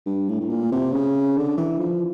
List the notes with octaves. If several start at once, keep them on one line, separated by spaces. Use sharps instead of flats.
G2
A2
A2
A#2
C3
C#3
D3
E3
F3